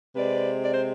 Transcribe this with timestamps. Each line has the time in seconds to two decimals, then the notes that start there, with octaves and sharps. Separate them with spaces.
0.15 C3 G#3 C4 B4 D5
0.63 D5
0.72 C5